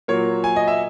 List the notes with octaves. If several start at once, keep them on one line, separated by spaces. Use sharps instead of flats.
A#2 F#3 A#3 C#5
G#5
D#5
E5